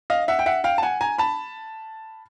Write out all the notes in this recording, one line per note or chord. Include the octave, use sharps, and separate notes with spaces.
D#5 F5
E5 F#5
G5
E5 F#5
F5 G5
A5
F#5 G#5
G#5 A#5
A5 B5